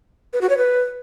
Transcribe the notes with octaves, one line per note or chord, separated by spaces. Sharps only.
B4
F#4
C#5
B4